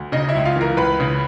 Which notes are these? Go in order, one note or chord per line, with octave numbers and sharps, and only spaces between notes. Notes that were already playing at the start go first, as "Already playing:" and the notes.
Already playing: D2
C#3 D#4 D#5
E4 E5
C#2
F4 F5
E3 A#4 A#5
C#2 B4 B5
C#3